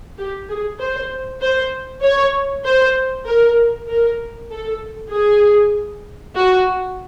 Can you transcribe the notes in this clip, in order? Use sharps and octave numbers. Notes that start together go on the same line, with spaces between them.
G4
G#4
C5
C5
C#5
C5
A#4
A#4
A4
G#4
F#4